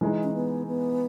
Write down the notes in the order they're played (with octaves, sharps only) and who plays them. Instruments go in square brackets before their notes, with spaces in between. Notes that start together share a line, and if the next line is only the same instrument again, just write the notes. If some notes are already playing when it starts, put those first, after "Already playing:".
[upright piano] E3 G#3 D#4
[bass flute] C#4
B3
B3